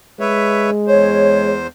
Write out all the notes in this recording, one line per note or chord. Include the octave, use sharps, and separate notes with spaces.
G#3 B4 C#5 E5
E2 C5 C#5